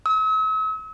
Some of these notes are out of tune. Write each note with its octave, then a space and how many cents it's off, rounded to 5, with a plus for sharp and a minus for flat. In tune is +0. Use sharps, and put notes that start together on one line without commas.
E6 -45